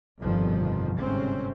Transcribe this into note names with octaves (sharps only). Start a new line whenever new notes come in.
G1 F2 B2 D#3 F3
G1 G#2 C3 C4 C#4